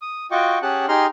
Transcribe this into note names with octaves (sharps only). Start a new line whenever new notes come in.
D#6
F4 F#4 D#5 G5 C#6 D6
C#4 G4 G#4 F#5 A5 F#6
D#4 G4 G#4 A#5 C6 F6